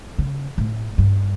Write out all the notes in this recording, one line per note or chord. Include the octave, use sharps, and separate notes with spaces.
C#3
A2
G2